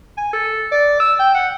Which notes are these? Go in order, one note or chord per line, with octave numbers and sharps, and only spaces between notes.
G#5
A4
D5
E6
G5
F#5